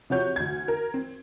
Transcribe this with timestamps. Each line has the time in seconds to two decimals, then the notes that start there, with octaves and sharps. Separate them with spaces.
0.10 C3 F3 F#4 C#5 G6
0.36 D2 G#6
0.68 A#4
0.94 C4